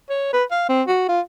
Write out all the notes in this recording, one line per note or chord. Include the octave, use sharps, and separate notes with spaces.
C#5
B4
F5
C4
F#4
F4